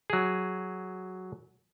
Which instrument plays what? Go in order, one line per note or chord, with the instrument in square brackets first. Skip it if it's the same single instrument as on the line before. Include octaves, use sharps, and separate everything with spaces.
[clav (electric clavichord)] F#3 G#4